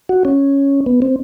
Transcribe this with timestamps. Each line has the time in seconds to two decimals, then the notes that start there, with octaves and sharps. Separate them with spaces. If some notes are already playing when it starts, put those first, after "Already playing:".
0.09 F#4
0.25 C#4
0.86 B3
1.02 C4